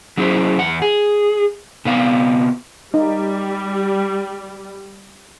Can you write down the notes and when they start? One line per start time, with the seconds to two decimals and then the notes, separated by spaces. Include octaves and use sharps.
0.17 F#3 C#4 E4 G#4 C5
0.59 E2 F#5
0.82 G#4
1.85 C3 B3 F5
2.94 G3 D#4